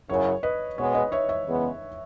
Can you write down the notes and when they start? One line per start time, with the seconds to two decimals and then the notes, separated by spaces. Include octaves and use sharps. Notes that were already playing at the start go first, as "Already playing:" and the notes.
0.09 F#2 C#3 F#3 C#4 E4 C#5
0.43 B4 D#5
0.77 B2 G#3 B3 C#5
0.94 B4 D#5
1.12 C#5 E5
1.29 C#5 E5
1.46 E2 C#3 G#3 B3